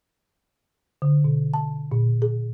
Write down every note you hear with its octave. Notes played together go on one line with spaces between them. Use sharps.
D3
B2
A5
A#2
G#4